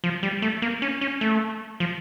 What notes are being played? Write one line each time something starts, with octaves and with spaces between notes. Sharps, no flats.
F3
G3
A3
A#3
C#4
C#4
A3
F3